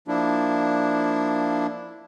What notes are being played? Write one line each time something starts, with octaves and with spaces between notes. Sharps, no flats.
F3 A#3 D4 E4